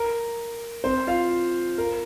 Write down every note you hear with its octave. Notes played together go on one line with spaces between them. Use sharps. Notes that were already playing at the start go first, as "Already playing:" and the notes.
Already playing: A#4
C4 C5
F4 F5
A#4